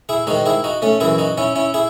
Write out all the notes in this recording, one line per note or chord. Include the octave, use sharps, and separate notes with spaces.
E4 G#4
G#2 D#3 D#4 F#4
E4 G#4
D#4 F#4
A3 C#4
F#2 E3 E4 G#4
D#4 F#4
C#4 E4
C#4 E4
E4 G#4